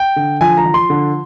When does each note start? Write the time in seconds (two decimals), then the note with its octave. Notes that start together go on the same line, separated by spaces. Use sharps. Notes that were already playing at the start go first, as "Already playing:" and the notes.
Already playing: G5
0.16 D3
0.41 F3 G#5
0.57 A#5
0.66 F3
0.74 C6
0.90 D3